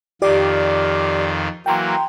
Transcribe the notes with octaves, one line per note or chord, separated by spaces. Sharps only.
F2 D#3 F4 G4 D5 D6
E3 F#3 A#3 G5 A#5 C6